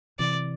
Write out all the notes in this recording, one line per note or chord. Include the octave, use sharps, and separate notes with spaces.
C3 E3 D5